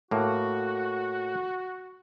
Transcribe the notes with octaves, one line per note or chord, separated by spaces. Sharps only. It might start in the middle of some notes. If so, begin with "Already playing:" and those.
A2 A#3 F#4